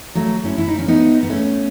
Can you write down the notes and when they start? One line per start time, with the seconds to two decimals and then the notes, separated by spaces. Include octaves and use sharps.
0.15 F#3 A3
0.44 C#4 E4
0.58 E4
0.68 D#4
0.79 C#4
0.88 B3 D#4
1.23 B3
1.30 A3 C#4